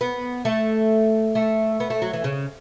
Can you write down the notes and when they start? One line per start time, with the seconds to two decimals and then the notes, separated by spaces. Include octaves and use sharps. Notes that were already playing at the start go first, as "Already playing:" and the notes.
0.01 B3
0.45 A3
1.35 A3
1.80 B3
1.90 A3
2.02 F#3
2.13 E3
2.24 C#3